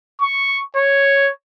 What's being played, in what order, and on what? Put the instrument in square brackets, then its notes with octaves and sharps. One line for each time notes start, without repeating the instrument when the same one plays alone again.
[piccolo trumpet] C#6
C#5